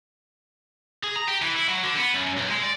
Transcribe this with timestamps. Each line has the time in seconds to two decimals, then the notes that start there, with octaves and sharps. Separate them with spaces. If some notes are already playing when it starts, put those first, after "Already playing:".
1.03 G#4
1.16 A#5
1.28 G4
1.42 E3
1.55 E4
1.68 F#3
1.84 D3
1.99 B3
2.15 F#2
2.38 B1
2.51 G#3
2.63 D5